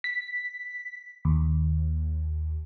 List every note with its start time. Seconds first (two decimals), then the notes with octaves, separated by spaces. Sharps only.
0.04 B6
1.25 D#2